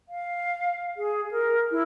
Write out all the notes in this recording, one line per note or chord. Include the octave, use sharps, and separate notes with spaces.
F5
G#4
A#4
E4